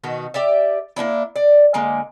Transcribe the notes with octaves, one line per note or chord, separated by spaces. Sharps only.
B2 D#3 F#4
G4 D5 E5
A#3 C4 D4 E4
D5
D3 G#3 A#3